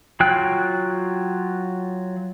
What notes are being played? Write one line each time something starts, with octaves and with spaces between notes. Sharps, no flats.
F#3 F4 G5 F#6